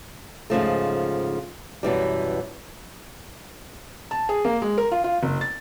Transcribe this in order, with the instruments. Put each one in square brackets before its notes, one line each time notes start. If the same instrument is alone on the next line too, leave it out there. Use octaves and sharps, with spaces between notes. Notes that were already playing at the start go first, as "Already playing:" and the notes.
[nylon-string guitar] G#2 C#3 F3 A3
F#2 B2 E3 G3
[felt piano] A5
G#4
A#3
G#3
A#4
F4
F4
F#1
A6